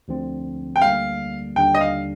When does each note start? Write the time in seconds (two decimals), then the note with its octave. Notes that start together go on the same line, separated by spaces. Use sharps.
0.08 D2 D3 F3 C4
0.76 G5
0.82 D2 D3 G3 A#3 F5
1.56 D#2 D3 G3 D4 G5
1.75 D#5
1.81 F5